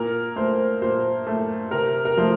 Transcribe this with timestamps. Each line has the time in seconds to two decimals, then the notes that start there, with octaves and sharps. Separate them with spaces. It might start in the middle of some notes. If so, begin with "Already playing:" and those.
Already playing: A#2 A#4
0.36 A3 C5
0.82 A#2 C5
1.27 A3
1.71 C3 A#4
2.05 A#4
2.17 F3 A3 C5